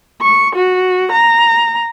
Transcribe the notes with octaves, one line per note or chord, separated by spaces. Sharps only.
C#6
F#4
A#5